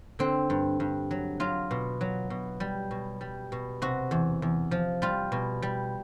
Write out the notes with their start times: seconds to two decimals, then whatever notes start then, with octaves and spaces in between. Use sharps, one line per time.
0.19 D3 C4
0.50 G2
0.80 G2
1.11 F#3
1.40 F#3 F4
1.71 B2
2.01 F#3
2.30 B2
2.60 G3
2.91 B2
3.21 G3
3.52 B2
3.82 C3 F#4
4.11 E2
4.42 E2
4.71 F3
5.02 G3 F4
5.32 B2
5.62 G3